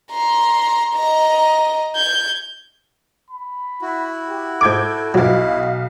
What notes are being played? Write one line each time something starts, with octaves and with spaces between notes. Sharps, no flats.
A#5 C6
D#5 A#5
G6 G#6
B5
E4 F#4
G4
G#2 A4 D6 G6 G#6 D7
B1 G2 F#3 D#5 F5